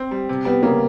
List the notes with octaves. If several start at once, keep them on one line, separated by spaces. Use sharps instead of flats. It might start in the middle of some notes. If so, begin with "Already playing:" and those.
Already playing: C4
G3
C3
G3 B3
C#3 A#3